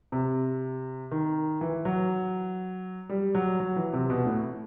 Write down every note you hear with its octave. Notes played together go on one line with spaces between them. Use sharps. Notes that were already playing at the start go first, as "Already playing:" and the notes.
C3
D#3
E3
F#3
G3
F#3
F#3
E3
C3
B2
A2